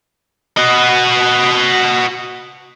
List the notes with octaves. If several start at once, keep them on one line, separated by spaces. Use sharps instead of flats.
F#4 D#5